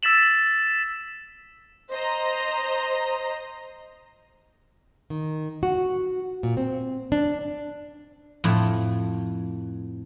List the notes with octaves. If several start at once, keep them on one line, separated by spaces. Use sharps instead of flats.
E6 A6 B6 E7 F#7
C5 D#5 A#5
D#3
F#4
A#2
C4
D4
F2 A2